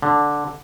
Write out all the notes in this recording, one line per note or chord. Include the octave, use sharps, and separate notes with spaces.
D3